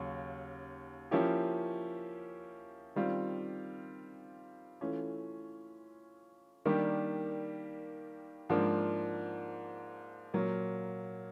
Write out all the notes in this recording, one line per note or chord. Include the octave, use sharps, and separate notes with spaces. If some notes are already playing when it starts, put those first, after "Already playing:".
Already playing: D#2 C#3 F#3
F3 A#3 C#4 E4 G4
D#3 G3 C4 F4
E3 A3 C#4 F4
D#3 G3 A#3 D4 G4
G#2 F3 A#3 D4
A#2 F#3 A#3